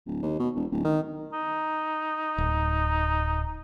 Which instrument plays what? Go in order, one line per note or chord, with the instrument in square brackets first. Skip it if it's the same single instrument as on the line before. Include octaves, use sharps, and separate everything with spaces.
[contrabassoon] D1
D#2
B2
E1
D1
D#3
[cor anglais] D#4
[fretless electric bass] D1